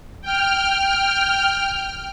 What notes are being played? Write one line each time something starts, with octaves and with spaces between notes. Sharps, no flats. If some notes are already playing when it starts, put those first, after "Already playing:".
G5 F6